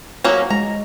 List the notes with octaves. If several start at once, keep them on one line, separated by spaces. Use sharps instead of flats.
F#3 A#3 C#4
G#3 A#5